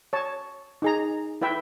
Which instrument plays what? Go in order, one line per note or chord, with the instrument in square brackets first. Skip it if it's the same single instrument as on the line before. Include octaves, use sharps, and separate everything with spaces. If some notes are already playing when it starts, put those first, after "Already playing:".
[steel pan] C#5 A5
D#4 G#4 A#5
E4 B4 E5 G5